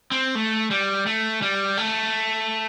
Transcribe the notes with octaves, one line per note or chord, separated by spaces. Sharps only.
C4
A3
G3
A3
G3
A3